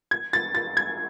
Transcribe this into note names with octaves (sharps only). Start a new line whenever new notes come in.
G#6
A6
A6
G#6